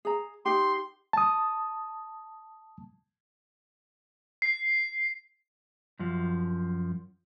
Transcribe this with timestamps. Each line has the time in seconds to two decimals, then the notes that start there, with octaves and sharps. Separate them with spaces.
0.05 G#4 A#5
0.45 D#4 G4 C6
1.13 A5 D#6
4.42 C7
5.99 F#2 F3